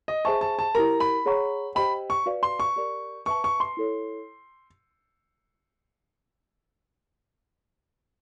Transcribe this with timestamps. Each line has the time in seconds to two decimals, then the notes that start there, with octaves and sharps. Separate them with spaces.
0.08 D#5
0.25 G#4 C5 E5 G#5 A5 C#6
0.41 A5
0.59 A5
0.75 E4 G4 A#4 A#5
1.00 B5
1.26 G#4 C#5 F#5 A#5 C#6
1.75 G4 C5 D#5 G5 B5
2.10 C#6
2.26 F#4 B4 D5 F5
2.43 C6
2.60 C#6
2.76 G4 A#4 D5
3.26 B4 E5 A5 C#6
3.44 C#6
3.60 C6
3.77 E4 A4 C#5